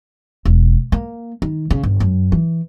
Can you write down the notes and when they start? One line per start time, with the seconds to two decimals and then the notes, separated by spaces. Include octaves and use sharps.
0.45 E1
0.92 A#3
1.42 D#3
1.71 C#3
1.83 G1
2.00 F#2
2.32 E3